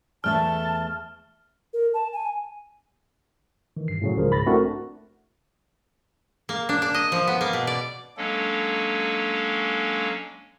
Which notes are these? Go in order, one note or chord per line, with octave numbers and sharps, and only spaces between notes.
E2 A3 E5 A5 F6
A#4
A5
G#5
D#3 E3
G2 C7
A2 C#3 F#3
C#2 F3 G#4 A#4
B1 G#2 B5 A6 A#6
A3 C4 D4 E4 F#4 A#4
A#3
D4
D4
D#5
F3
B3
A#3
B2
D5
F#3 G#3 A#3 C#4 D4 A4